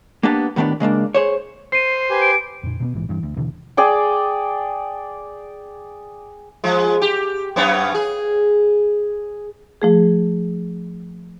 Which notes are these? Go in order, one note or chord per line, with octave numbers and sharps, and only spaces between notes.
A#3 B3 D4 G4 A5
A2 D#3 B3 D4 G4
C#3 G#3 A#3 D4
G#4 C5 C#5
C5 C7 D#7
G4 B4 G#5
D7
F2 A#2
B2 A#3 B3
A#1 G#2 E3
G2 E3
D2
D#2 B2 D3 E3
G#4 D5 G5
F3 G#3
G4
F#2 B3 C#4
G#4
F3 A3 G#4